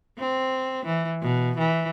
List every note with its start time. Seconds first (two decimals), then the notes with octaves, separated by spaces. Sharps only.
0.19 C4
0.86 E3
1.22 B2
1.58 E3